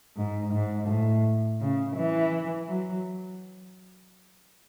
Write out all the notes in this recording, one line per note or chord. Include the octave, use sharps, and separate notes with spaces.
G#2
G#2
A2
C#3
E3
F#3